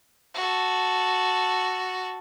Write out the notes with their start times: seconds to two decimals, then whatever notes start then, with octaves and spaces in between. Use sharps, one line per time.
0.34 F#4 A4